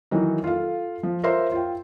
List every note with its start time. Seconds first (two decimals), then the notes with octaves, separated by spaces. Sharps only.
0.11 D#3 E3 F#3 D#4
0.44 F4 A4 F5
1.03 F3
1.23 F4 A#4 C5 C#5 E5 C6
1.52 F4 G5